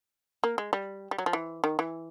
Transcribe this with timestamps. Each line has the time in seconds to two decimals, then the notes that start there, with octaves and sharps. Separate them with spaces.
0.44 A#3
0.58 G#3
0.73 G3
1.11 G3
1.18 F#3
1.26 F3
1.33 E3
1.64 D#3
1.79 E3